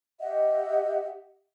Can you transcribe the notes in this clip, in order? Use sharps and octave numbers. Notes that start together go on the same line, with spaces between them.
G4 D#5 E5 F#5